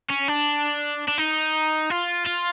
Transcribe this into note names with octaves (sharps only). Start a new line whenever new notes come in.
C#4
D4
D4
D#4
F4
F4